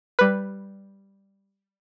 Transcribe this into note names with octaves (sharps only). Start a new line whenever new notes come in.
G3 B4